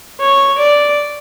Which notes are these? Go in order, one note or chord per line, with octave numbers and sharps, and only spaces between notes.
C#5
D5